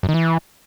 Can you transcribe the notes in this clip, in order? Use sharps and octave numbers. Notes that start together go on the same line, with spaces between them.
F#2
D#3
E3